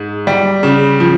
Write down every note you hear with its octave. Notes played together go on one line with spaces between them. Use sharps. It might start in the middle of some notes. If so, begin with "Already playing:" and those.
Already playing: G#2
G3
C#3
F3